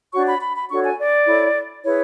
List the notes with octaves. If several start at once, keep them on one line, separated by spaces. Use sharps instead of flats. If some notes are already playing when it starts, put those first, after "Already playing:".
D4 F#4 C#5 C#6
B5
B5
B5
D4 F#4 A4 C#5 C#6
G#5
D5
E4 A4 C#5
E4 G#4 B4 C#5